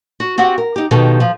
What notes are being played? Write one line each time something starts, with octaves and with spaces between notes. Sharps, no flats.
F#4
C4 F#4 G4 F#5
A#4
D#4 G4
B2 D#3 F3 G4 A4
F3